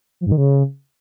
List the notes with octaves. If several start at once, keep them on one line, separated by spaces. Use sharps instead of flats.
F3
G2
D#3
C#3